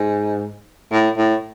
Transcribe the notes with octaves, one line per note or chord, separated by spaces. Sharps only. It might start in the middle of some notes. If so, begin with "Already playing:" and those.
Already playing: G#2
A2
A2